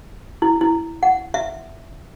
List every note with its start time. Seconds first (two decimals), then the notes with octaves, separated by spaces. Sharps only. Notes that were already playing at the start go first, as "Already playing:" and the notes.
0.42 E4
0.61 E4
1.03 F#5
1.34 E5